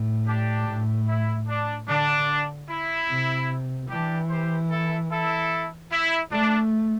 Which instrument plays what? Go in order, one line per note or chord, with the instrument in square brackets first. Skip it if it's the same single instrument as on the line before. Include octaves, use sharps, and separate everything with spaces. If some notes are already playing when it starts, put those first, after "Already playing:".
Already playing: [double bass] A2
[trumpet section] D4 G4
[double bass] A2
[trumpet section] E4
D4
[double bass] D3 [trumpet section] D4
[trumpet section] E4
[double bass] C3
[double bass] E3 [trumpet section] D4 G4
[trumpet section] G4 C5
E4 A4
E4 A4
E4
[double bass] A3 [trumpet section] D4